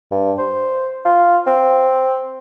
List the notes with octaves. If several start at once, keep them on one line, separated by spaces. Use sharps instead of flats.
G2
C5
F4
C4